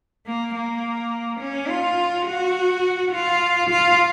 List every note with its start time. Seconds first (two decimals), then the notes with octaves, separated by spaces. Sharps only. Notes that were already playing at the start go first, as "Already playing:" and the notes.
0.26 A#3
0.55 A#3
1.40 C#4
1.69 F4
2.26 F#4
3.12 F4
3.69 F4